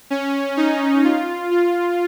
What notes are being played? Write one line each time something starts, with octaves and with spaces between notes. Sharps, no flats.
C#4
D#4
F4
F4